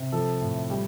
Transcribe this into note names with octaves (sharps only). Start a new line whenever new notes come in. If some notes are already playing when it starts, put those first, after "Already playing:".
Already playing: C3
F3 A4
A2
G3